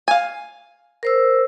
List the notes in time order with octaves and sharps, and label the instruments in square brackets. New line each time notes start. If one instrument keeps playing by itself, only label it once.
[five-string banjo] F5 G#5
[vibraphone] A#4 C5 E6